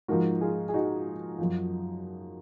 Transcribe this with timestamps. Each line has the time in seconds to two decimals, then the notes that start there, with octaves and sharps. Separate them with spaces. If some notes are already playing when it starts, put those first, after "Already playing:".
0.08 G#2 F3 F#4 A#4
0.41 F4 G#4
0.68 G#4
0.74 D#4 F#4
1.39 F#2 F3